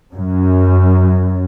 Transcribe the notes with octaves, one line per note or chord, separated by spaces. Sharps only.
F#2